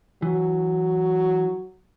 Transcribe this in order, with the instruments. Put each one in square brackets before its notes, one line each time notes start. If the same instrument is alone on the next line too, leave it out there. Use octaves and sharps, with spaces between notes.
[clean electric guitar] E3 [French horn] F#3